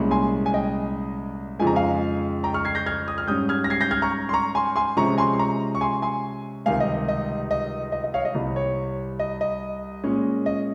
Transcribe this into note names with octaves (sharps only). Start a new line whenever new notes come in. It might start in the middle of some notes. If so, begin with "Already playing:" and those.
Already playing: C2 A#2 G#3 C#4
G#5 C6
G#5
D#5 G5
F2 C#3 F3 G#3 D#4 G#5
A#5
F5 G#5
G5 A#5
C#6 F6
G#6 C7
G6 A#6
F6 G#6
D#6
F6
G#2 G3 C#4 D#6 G6
F6 G#6
A#6
G#6 C7
G6 A#6
F6 G#6
A#5 C#6
C6
A#5 C#6
G#5 C6
G#5 C6
C3 F3 G#3 C#4 A#5 C#6
G#5 C6
C6
A#5 C#6
C#6
G#5 C6
G#5 C6
C#2 C3 D#3 G3 F5 G#5
D#5
D#5
D#5
D#5
D#5
D#5
C#5 F5
D#5
C2 C3 G3
C#5
D#5
D#5
A#2 G#3 C#4
D#5